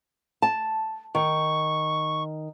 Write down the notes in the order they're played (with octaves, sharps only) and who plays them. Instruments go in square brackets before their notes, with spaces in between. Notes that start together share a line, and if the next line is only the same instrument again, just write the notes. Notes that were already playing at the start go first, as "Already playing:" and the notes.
[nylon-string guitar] A5
[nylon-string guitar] D#3 [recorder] C#6